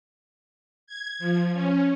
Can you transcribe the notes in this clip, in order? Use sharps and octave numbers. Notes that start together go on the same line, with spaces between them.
G#6
F3
C#4